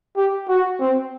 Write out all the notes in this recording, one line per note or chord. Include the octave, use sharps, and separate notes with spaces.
G4
F#4
C4